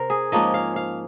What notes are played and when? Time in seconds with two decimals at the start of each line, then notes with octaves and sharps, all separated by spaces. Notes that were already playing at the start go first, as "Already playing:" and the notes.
Already playing: C3 A#4 C5
0.10 G#4
0.32 G#2 F3 A#3 C#4 D#5
0.54 F5
0.76 F5